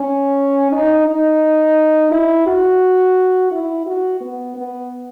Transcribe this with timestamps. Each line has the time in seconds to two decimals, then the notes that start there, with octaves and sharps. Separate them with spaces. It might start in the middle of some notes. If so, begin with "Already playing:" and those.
Already playing: C#4
0.72 D#4
1.07 D#4
2.11 E4
2.47 F#4
3.51 E4
3.86 F#4
4.21 B3
4.56 B3